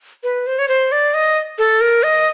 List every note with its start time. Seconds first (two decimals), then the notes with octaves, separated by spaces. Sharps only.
0.23 B4
0.47 C5
0.59 C#5
0.68 C5
0.92 D5
1.14 D#5
1.58 A4
1.81 A#4
2.03 D#5